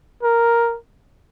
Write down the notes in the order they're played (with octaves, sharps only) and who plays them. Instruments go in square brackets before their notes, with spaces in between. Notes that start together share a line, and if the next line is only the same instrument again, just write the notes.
[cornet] A#4